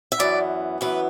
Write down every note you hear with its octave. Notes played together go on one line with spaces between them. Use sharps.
E5
F#2 E3 B3 D5
F#2 E3 B3 B4